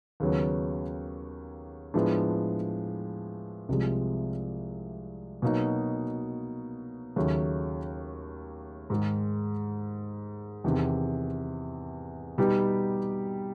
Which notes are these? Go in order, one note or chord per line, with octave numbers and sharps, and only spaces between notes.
D#2 C#3 F#3 B3
A2 F3 G#3 B3 D4
C2 C3 F3 G#3
B2 F#3 A#3 D#4
D#2 C#3 F#3 A3
G#2 D#3 G#3
E2 C3 D#3
B2 G3 B3 D#4 G4